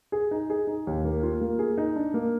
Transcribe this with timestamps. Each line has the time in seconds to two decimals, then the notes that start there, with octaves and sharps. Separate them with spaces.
0.12 G#4
0.31 D#4
0.50 G#4
0.67 D#4
0.87 D#2
1.05 A#3
1.23 F4
1.41 A#3
1.59 G#4
1.78 D#4
1.96 D4
2.14 A#3